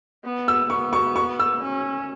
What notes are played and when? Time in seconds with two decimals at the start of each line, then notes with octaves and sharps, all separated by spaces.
0.24 B3
0.48 E6
0.70 B3 C#6
0.93 C#6
1.16 C#6
1.39 E6
1.62 C#4